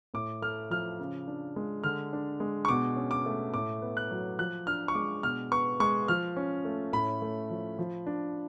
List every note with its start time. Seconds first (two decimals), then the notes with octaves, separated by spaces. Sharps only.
0.14 A2 D6
0.42 A3 F6
0.70 F3 F6
1.00 C#3
1.28 D4
1.56 G#3
1.84 D3 F6
2.13 D4
2.40 G#3
2.65 C#6
2.68 B2 D6
2.97 C#4
3.11 D6
3.26 A3
3.54 A2 D6
3.82 B3
3.97 F#6
4.11 F#3
4.39 F3 F#6
4.67 D4 F6
4.88 C#6
4.95 G#3 D6
5.23 B2 F6
5.51 B3 C#6
5.80 G#3 C#6
6.08 F3 F6
6.37 C#4
6.65 A3
6.93 A2 B5
7.22 A3
7.50 F3
7.79 F3
8.07 D4